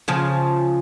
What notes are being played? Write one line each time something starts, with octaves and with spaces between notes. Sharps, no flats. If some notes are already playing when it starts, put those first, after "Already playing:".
C#3 F3